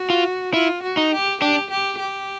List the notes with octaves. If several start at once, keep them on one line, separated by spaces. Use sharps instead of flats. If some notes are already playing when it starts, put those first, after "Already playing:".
Already playing: F#4
F4
E4 F4
F#4
D#4
G4
D4 G4
G4
G4